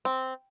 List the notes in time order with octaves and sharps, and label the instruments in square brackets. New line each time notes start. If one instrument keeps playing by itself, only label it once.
[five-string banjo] C4